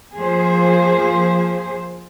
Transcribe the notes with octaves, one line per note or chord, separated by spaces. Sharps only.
F3 A#3 G#4 C5